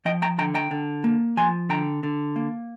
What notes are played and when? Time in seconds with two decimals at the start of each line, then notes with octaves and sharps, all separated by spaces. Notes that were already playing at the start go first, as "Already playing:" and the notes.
0.05 F3 D#5 G5
0.22 G5 A#5
0.38 D3 G5 A#5
0.55 G5 A#5
0.71 D3
1.04 A#3
1.37 F3 G#5 C6
1.69 D3 G5 A#5
2.03 D3
2.36 A#3